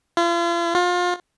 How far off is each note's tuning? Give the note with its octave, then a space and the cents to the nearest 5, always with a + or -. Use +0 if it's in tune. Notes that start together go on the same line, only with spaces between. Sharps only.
F4 -40
F4 +30